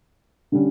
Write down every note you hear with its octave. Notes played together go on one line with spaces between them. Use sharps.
D3 G3 C#4